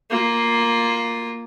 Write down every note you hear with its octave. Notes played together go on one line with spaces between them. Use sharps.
A#3 F4